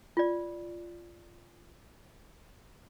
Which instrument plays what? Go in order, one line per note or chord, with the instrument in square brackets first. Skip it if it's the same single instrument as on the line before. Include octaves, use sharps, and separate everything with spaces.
[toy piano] F4 D5